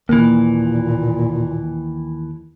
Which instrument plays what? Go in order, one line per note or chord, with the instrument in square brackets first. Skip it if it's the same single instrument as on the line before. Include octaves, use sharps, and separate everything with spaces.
[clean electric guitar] D#2 E3 [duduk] A#2 [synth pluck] A#3